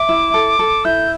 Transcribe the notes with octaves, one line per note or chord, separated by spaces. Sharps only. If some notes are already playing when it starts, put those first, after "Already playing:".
Already playing: E5 D6
E4
A4
A4
E4 G6